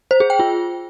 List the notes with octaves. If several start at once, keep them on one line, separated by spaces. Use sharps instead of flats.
C5
G#4
G5
F4